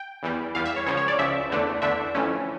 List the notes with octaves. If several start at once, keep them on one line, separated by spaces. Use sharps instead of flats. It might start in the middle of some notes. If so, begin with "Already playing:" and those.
Already playing: G5
E2 E3 G3
E2 E3 G3 F5
E5
C#5
C#2 C#3 F3 C#5
C#5
D5
C#2 C#3 F3 E5
E2 D3 A3 D4
E2 D3 A3 D4 E5
F2 E3 A3 C#4